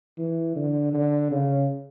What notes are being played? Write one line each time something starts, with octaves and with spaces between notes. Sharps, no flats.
E3
D3
D3
C#3